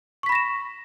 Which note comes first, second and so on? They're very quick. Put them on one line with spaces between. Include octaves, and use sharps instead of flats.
C#6 B6 B5 A#6 E7